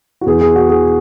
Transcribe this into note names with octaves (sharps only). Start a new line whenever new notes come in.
F#4
E2 E3 G#4
G#4
F#4
G#4